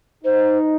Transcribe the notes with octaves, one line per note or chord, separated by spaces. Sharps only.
D#4 C5